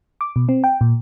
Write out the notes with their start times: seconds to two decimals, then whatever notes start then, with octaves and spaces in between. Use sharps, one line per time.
0.21 D6
0.36 B2
0.49 C4
0.64 G5
0.81 A#2